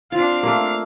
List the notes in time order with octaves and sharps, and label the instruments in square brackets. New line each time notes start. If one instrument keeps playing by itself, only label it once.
[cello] C4 D4 [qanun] F4 [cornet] F5
[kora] A3 A#3